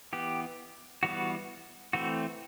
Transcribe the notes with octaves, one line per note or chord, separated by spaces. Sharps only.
E3 B3 G4
E3 G3 B3 F#4
E3 A3 C4 F#4